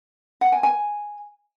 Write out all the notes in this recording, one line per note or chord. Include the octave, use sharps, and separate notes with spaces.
F#5
G#5
G#5